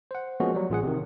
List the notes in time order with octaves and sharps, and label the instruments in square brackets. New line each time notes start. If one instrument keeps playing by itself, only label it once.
[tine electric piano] C5 F#5
F3 G#3 A#3 B3 C#4 F#4
F#3 G3
A1 F4 G#4 F#5
C3 D#3